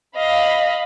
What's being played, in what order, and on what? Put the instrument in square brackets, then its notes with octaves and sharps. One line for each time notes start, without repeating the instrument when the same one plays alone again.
[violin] D#5 [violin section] F5 B5